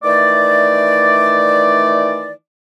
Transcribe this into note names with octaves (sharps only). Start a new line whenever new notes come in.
D#3 E3 A3 D5